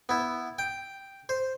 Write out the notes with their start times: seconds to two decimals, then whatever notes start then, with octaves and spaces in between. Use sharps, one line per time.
0.09 B3 E4
0.59 G5
1.29 C5